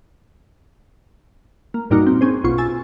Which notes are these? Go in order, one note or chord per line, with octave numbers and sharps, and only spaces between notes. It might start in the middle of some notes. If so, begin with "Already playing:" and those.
A#3
G2 A#2 G3 A#3 D#4 F#4
C4
C4 C#4 G#4 C5
B1 B2 F4 C#6
G#5 E6 A6